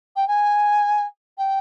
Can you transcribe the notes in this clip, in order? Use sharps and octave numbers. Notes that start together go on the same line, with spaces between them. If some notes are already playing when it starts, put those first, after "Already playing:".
G5
G#5
G5